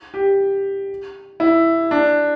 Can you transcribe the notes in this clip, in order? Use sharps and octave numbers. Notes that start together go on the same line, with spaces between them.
G4
E4
D4